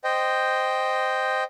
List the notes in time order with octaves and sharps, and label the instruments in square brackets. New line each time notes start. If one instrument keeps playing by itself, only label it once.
[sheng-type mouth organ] C5 D#5 G5